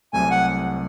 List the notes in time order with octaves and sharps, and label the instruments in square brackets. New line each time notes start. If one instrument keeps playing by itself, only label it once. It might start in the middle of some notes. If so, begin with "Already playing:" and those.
[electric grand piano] C2 C3 F#3 A3 [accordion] G#5
[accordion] F#5